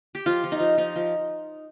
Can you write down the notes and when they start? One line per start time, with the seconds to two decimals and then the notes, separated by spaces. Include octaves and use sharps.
0.15 G4
0.26 F3 F4
0.44 F3
0.52 D#4
0.60 F3
0.77 F3 D#4
0.96 F3